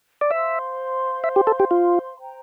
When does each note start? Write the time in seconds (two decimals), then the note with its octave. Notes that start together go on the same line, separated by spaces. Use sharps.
0.21 D5
0.31 C5 E5 F5 C6
1.24 E5
1.36 G4
1.47 A4
1.60 G4
1.71 F4
2.18 C5 G5 A#5